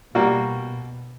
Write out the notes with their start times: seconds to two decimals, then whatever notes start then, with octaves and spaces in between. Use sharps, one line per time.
0.15 B2 G3 A#3 F#4